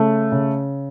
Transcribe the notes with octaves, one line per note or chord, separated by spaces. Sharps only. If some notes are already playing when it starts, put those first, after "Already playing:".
Already playing: C#3 A3
C#3